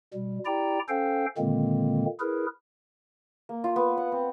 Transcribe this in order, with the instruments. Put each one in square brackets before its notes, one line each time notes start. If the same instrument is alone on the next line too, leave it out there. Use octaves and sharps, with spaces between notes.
[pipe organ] B2 G3
E4 G4 D5 G5 A#5
C#4 A4 C5 F5 G5
A#2 D3 D#3 G#3 A#3 C4
E4 G#4 A#4 B4
[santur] A#3
F4
B3
F#5
C4